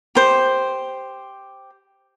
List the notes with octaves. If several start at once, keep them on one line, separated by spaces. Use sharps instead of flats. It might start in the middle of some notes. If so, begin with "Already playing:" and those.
G4 C5